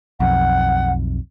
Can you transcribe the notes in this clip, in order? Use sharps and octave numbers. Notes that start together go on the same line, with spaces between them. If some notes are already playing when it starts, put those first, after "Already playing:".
B1 F2 F#5